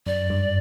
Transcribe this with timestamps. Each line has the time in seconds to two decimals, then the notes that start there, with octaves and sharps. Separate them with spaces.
0.06 F#2 D5
0.30 G2